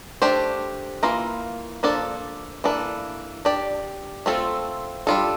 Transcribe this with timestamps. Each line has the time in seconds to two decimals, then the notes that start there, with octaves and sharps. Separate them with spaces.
0.22 A3 D4 G4 C5
1.03 E3 A#3 F4 A#4
1.83 F3 A#3 D4 A4 D5
2.64 E3 A#3 D4 A4
3.45 D4 G4 D5
4.26 A3 C4 F4 A4
5.07 G3 D4 F4 A4